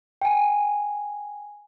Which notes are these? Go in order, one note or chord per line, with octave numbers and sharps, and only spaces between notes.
G5 G#5